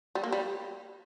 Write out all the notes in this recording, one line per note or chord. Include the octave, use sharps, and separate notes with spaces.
G3
A#3
G3